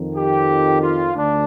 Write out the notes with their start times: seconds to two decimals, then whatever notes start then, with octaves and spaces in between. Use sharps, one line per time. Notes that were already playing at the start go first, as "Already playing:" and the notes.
Already playing: F2 D#3
0.16 G4
0.81 F4
1.15 D2 D4